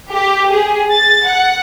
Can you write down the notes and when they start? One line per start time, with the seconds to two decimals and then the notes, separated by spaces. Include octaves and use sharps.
0.12 G4
0.51 G#4
0.92 A6
1.25 F#5